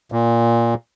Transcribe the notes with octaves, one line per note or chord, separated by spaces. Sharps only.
A#2